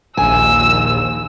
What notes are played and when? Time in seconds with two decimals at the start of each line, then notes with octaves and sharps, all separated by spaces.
0.17 A#1 D#2 G#5 E6